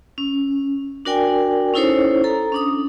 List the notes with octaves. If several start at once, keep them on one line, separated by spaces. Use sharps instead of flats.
C#4
D4 F#4 A#4 D5 G5 G#5
C#4 D#4 E4 A4 C5 C#5
A4 A#5
C#4 D4 D#6